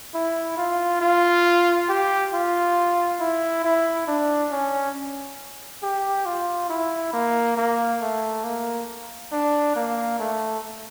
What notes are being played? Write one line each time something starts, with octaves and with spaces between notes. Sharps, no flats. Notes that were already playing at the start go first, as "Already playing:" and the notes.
E4
F4
F4
G4
F4
E4
E4
D4
C#4
G4
F4
E4
A#3
A#3
A3
A#3
D4
A#3
A3